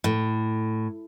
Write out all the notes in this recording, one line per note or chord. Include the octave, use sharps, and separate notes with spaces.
A2